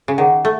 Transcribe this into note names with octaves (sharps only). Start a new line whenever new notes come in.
C#3
D#3 G#4 C#5 F#5
A3